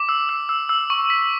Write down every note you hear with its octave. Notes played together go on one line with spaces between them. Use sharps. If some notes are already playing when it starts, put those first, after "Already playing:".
Already playing: D6
E6
E6
E6
E6
C#6
B6